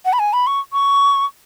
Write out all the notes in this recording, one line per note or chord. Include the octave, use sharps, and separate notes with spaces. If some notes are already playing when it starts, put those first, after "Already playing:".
F#5
B5
G#5
B5
C#6
C#6